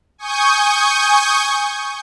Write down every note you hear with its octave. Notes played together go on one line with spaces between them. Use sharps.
G#5 C#6 D#6 G6